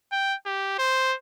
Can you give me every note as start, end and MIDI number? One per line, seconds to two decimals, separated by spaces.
0.12 0.35 79
0.46 0.76 67
0.79 1.15 72